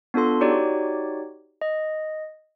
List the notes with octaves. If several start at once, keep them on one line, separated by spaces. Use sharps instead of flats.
B3 D4 F4 A4 C6
D#4 F#4 G4 C#5 D5
D#5